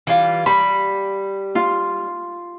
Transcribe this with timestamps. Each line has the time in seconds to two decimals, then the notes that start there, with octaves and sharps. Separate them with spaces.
0.07 E3 G3 F4
0.46 G3 B5
1.55 F4